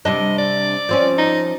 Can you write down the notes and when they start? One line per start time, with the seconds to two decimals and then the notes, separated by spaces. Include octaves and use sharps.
0.05 C3 G3 D4 D#5
0.38 D5
0.89 F3 C4 C#4
1.18 D#4